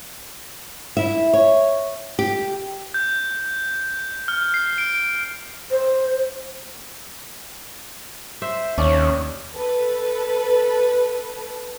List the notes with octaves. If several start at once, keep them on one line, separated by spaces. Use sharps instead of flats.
E4 E5
C#5
G4
G6
F6
C7
D7
C5
C5 E5
D#2 C#4 D4 D5
A4 B4